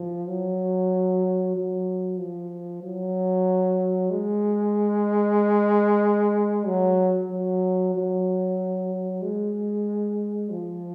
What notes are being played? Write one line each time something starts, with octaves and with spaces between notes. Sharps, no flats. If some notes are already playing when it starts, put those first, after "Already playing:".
Already playing: F3
F#3
F#3
F3
F#3
G#3
F#3
F#3
F#3
G#3
F3